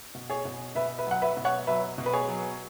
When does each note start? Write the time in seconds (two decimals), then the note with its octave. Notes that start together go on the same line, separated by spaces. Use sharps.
0.15 B2
0.30 G#4 C#5
0.45 B2
0.75 B2 B4 E5
0.98 B4 E5
1.07 F#3 F#5
1.22 B4 E5
1.37 B2
1.45 C#5 F#5
1.67 F#3 B4 E5
1.98 B2
2.06 B4
2.13 G#4 C#5
2.28 F#3